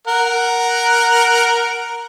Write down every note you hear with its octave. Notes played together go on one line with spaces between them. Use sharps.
A#4 F#5